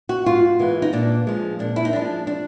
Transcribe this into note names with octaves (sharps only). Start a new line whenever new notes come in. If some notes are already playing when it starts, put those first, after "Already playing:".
F#4
G#2 F4
E3 G#3 B3
D#4
A#2 D4
F3 G#3
A#2 D4
E4
D#4
F3 G#3 D4
D4